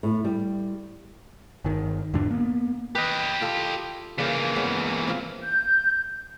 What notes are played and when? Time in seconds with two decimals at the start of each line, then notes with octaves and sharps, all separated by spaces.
0.03 A2
0.24 G3
1.65 G1 D#3
2.14 E2 G#2 D3 D4
2.31 A#3 B3
2.95 G4 B4 D#5
3.41 F4 A4
4.18 C#3 E3 A#3 D5 G5
4.56 G#3 B3 C#4
5.07 C4 F4
5.43 G6